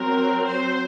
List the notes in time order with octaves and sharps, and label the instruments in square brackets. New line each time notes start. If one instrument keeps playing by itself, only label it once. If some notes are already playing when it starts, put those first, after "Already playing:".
Already playing: [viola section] F#3 C4 A#4
C5